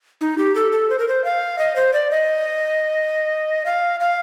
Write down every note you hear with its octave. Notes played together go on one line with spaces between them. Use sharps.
D#4
G4
A4
A4
C5
A#4
C5
F5
D#5
C5
D5
D#5
F5
F5